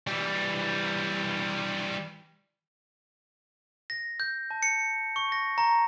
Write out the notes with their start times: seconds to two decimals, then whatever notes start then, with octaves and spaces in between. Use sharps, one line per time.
0.07 E3 G3
3.90 A#6
4.20 G6
4.51 A5
4.63 C#7
5.16 C#6
5.32 A#6
5.58 A#5